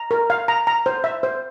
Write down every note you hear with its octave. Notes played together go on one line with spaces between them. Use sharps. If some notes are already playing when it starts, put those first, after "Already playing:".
Already playing: A#5
A#4
F5
A#5
A#5
C5
E5
C5